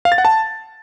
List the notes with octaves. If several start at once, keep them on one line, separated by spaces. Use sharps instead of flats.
F5
A6
F#5
A5